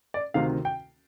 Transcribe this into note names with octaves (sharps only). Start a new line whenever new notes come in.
D5
D2 C3 D#3 F5
G5